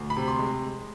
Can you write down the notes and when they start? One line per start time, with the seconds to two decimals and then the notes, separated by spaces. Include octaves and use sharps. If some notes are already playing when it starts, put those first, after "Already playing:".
Already playing: D2
0.10 B5
0.17 C3
0.28 C6
0.39 G#3